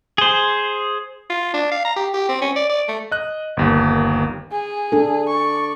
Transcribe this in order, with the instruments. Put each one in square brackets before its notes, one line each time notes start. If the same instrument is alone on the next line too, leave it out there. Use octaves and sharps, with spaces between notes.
[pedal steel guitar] G#4 C5
[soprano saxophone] F4
D4
F5
A#5
G4
G4
C4
C#4
D5
D5
A3
[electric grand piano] D#5 F#6
G1 D#2 A#3
[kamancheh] G#4
[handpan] D4 A4
[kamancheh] D5 C#6